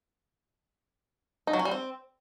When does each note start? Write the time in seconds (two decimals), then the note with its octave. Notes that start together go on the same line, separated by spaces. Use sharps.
1.47 D#4
1.53 F#3
1.59 C#4
1.65 G3
1.71 C4